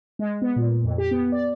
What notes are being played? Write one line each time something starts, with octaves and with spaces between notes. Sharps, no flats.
G#3
B3
A#2
F2
G4
B3
D5